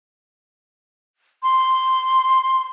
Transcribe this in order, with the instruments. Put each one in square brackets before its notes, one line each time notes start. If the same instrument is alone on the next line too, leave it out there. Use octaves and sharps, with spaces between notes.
[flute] C6